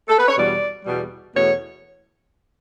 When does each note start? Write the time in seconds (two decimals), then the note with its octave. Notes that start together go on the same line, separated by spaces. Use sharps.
0.08 A4
0.18 B4
0.27 C#5
0.36 E2 B2 G3 D5
0.85 E2 B2 G3
1.34 E2 B2 A3 C#5